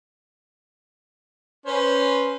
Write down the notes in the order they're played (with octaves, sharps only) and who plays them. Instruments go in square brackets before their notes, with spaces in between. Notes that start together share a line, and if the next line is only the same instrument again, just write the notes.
[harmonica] C#4 B4 C5